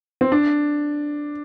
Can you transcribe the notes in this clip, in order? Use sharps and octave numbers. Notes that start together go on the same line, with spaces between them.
C4
D4